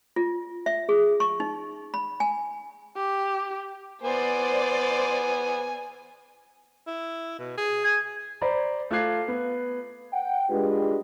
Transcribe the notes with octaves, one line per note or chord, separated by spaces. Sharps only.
F4
E5
G#4
C#6
D#4
B5
G#5
G4
B3 C5 D5 G#5
E4
B2
G#4
G#5
C5 D5 A#5 B5
A3 F4 D6 F#6 G#6 C7
B3
F#5 G5
G#3 D4 F4 G4 B4